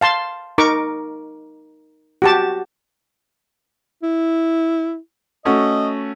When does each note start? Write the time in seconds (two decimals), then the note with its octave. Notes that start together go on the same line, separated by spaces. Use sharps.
0.01 F5 A5 C6
0.58 D#4 A#4 C#6 D6
2.22 F#4 G4 A5
4.03 E4
5.45 A3 C#4 F#4 D#5